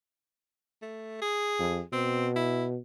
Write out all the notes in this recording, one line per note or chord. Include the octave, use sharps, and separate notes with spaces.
A3
G#4
F2
B2 C4
E4